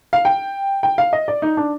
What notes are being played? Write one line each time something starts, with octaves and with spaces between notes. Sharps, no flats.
F5
G5
G5
F5
D#5
D5
D#4
D4